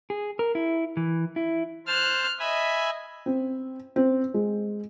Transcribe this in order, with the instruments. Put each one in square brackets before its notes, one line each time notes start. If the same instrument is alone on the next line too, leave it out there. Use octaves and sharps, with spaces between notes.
[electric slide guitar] G#4
A#4
E4
E3
E4
[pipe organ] C5 A5 [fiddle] F6 F#6
[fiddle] D#5 [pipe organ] E5 G#5 B5
[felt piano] C4
C4
G#3